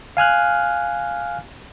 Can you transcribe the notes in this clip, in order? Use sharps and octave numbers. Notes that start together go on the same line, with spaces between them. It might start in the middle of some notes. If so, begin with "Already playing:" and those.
F5 G#5 F6 F#6